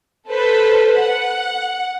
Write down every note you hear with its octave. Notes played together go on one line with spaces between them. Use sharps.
A4 B4 C5
F#5